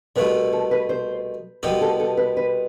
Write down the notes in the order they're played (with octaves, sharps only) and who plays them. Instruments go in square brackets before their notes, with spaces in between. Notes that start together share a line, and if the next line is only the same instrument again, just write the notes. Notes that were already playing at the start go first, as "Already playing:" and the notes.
[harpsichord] C2 B2 A3 E4 [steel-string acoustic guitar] B4
[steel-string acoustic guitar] A4
B4
C5
[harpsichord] C2 B2 B3 E4 G4 [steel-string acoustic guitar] C5
[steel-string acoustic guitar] A4
A4
B4
B4